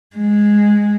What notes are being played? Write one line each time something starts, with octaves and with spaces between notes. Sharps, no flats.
G#3